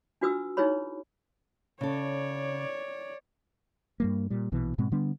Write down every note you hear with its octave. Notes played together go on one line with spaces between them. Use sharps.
D4 F4 F#4 B4 D#6 E6
D#4 E4 G#4 B4 C#5 B5
C#3 A4 C#5 D5
G2 G3 A#3
A#2 G3
A#1 B2 E3
G#2 B2 G#3 C4
D3 G3 B3 D4